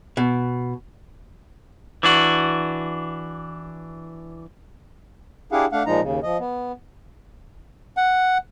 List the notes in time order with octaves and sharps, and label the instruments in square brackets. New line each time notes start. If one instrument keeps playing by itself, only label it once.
[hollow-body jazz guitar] B2
[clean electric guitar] E3 D4 F#4
[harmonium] D4 E4 G4 G#4 F5 F#5
A3 D4 F5 F#5
A#2 F3 G#3 D#4 A#5
D#2 C#3
F3 D#5
B3
[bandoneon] F#5